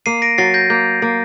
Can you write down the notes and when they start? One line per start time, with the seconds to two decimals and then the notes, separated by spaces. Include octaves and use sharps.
0.06 A#3 C7 D#7
0.22 A#6 D7
0.38 F#3 A6 C7
0.54 G6 A#6
0.70 A#3 G6
1.02 A#3